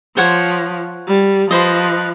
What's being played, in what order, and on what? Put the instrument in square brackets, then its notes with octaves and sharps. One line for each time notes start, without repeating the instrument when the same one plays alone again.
[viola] F3 [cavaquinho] C5 C#5 F#5
[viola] G3
[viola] F3 [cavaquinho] B4 C5 D#5